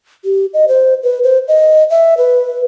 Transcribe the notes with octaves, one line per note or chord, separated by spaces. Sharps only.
G4
D#5
C5
B4
C5
D#5
E5
B4